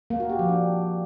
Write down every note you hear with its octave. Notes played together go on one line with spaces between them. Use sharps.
A#3
F#4
G4
F3
D4